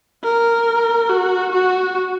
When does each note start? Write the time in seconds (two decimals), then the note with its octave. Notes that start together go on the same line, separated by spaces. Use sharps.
0.24 A#4
1.10 F#4
1.52 F#4